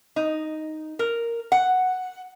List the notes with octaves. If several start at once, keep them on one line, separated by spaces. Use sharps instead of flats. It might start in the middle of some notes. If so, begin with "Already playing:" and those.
D#4
A#4
F#5